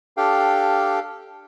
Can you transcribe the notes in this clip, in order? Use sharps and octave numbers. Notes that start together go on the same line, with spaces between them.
D4 G4 A4 F5 G5